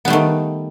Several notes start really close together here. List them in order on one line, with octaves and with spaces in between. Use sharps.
B3 G3 A3 D#3